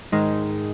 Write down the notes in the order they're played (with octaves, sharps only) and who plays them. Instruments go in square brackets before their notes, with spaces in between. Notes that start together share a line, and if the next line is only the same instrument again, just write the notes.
[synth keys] G#2 D#3 G#3 D#4